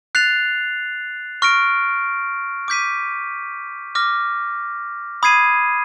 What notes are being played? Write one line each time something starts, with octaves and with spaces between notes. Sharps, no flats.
F#6 A6 C7 F7
C#6 F6 A#6 D7
D6 G6 B6 D#7
D6 F6 A#6
B5 D#6 G#6 C7 D#7